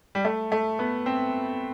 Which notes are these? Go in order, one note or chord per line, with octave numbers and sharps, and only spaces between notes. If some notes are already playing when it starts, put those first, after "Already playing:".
G3
A3
A3
B3
C4